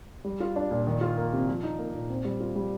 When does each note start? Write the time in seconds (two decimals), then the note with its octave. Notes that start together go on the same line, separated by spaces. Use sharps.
0.25 G3
0.40 F4
0.56 D4
0.71 A#2
0.87 D#3
1.01 F4
1.17 A#3
1.33 C3
1.48 F3
1.63 D#4
1.79 A#3
1.94 A#2
2.10 C4
2.25 G3
2.40 F4
2.56 G3